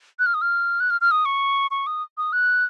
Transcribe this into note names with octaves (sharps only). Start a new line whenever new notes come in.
F#6
F6
D#6
F6
F#6
F6
F6
D#6
C#6
C#6
D#6
D#6
F#6